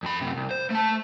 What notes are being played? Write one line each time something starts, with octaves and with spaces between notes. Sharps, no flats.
F2 B5
F#2 C3
C2
C5
A3 A5